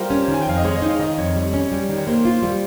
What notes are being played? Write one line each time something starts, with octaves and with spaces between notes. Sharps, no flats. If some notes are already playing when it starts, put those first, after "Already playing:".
Already playing: G3 F4 G4 A#4 C5
C#4
D#3
G#5
G5
F2 F5
D#5
G#3 C#5
D#5
D#4
F5
D#3 D#5
F2 C#5
G3
C#4
G3
D#3
C#5
A#3 C5
F4
G3